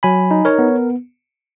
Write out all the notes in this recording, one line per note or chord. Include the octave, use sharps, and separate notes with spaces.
F#3 G#5 B5
D#4
A#4 C#5
B3